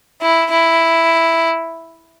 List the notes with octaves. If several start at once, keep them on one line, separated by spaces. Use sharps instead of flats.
E4
E4